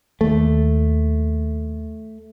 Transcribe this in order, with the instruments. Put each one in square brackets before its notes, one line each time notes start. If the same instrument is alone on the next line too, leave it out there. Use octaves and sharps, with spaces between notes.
[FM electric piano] D#2 [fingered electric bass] A3